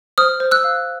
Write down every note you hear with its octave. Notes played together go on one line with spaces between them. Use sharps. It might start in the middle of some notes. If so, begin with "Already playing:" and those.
C5 D#6 F6
C5
E6 F#6
F5